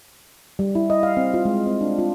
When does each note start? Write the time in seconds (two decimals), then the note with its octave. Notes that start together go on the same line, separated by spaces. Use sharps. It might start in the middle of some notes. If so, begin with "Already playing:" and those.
0.59 G3
0.75 E4
0.90 D#5
1.03 F5
1.17 C4
1.34 F4
1.45 G#3
1.67 C4
1.81 D4
1.98 F4